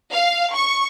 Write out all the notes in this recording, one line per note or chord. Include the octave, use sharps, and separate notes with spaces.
F5
C#6